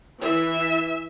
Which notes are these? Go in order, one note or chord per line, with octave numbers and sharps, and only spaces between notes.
E3 E5